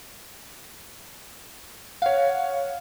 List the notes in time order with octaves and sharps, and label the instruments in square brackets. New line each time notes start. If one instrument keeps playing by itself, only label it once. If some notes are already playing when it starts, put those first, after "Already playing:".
[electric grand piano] C#5 F#5 [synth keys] F5